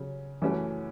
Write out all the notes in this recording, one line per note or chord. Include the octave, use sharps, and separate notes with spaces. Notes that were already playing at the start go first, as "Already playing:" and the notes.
Already playing: C#3 F#3 C#4
F#2 E3 A3 C#4 F#4